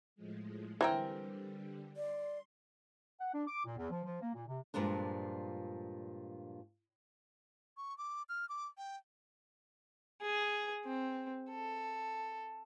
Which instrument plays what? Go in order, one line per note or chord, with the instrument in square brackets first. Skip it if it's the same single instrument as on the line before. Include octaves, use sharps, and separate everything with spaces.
[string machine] A2 F3 G#3
[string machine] D3 G3 [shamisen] E3 [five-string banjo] C4 A#4 G5
[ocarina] D5 [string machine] C6
[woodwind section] F#5
D4
D6
A#2
E2
F3
F3
A#3
A#2
C3
[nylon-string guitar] G2 A#2 F3 G#3 D4
[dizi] C#6
D6
F6
D6
G5
[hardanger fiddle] G#4
C4
A4